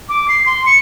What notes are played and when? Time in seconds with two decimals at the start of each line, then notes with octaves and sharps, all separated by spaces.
0.09 D6
0.28 C7
0.46 C6
0.66 C#7